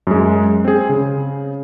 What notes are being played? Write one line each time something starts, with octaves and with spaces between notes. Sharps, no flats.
F#2 G#3
C4 G#4
C#3